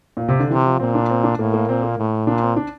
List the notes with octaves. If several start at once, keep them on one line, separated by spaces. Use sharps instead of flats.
A#2
C3
D3
C3 E3
F3
A#2 C4
D4
C4
D4
A2 A#3
A#3
A#2 C4
A#3
A2
A#2 D4
C4
D4